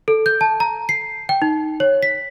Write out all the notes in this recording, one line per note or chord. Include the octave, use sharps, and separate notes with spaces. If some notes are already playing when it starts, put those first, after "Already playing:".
A4
G6
A5
A#5
C7
G5
D#4
C#5
B6